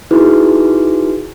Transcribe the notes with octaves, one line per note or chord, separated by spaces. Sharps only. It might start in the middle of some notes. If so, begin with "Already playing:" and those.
D#4 E4 F#4 G#4 B4